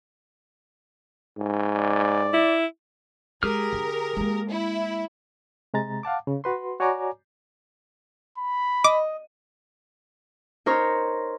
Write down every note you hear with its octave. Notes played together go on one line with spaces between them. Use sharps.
G#2
D5
E4
G#3 G4 G#4 A#4 F6
D3
G#3 A#3
E4
C3 G#3 A#5 A6
F5 F#5 A5 D6
C#3
F#4 B4 C6
F#4 C#5 D5 G#5 A#5 D6
B5
D#5 D6
D#4 A#4 C5 C#5